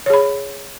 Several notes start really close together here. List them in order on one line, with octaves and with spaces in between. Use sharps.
C#5 G#4 B5